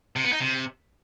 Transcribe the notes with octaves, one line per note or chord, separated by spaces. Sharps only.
C3
B3
D#4
C3